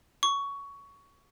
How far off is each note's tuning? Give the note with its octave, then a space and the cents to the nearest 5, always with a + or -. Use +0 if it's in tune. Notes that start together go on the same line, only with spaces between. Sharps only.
C#6 +15